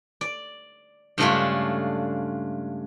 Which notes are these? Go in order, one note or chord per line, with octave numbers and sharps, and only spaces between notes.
D5
G2 C#3 G#3 A3 D4 F4